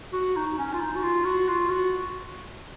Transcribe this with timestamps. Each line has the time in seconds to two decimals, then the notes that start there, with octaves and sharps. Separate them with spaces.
0.13 F#4
0.36 D#4
0.58 C#4
0.73 F4
0.80 D#4
0.96 F#4
1.03 F4
1.25 F#4
1.48 F4
1.69 F#4